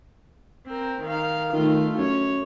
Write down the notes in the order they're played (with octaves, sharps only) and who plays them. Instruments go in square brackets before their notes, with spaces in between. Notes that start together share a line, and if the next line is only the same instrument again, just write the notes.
[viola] C4 A#4
D#3 F5
[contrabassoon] D#3 [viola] A3 F4
[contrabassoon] F#2 [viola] C#5